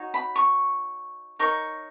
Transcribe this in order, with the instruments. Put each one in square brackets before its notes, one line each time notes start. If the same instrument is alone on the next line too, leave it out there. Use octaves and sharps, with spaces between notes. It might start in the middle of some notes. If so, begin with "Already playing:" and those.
Already playing: [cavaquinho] D#4 F#4 C#5
B5
C#6
D#4 A#4 C#5 C#6